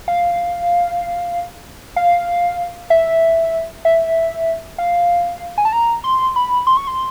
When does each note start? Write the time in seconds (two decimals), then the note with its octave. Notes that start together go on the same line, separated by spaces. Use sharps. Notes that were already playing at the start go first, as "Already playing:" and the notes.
0.08 F5
1.96 F5
2.90 E5
3.85 E5
4.78 F5
5.58 G#5
5.65 A5
5.72 A#5
6.04 C6
6.36 B5
6.67 C6
6.77 C#6
6.87 C6